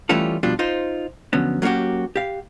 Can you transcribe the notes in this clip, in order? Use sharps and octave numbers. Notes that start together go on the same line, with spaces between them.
E3 G3 A3 C#4 F4 A4
F2 B2 G3 D4 F4
D#4 F4 C5
D3 F3 F#3 B3 C#4
F#3 A#3 C#4 F#4 G4
G4 F5